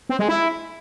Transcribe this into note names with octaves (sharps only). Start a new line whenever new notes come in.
C4
G#3
E4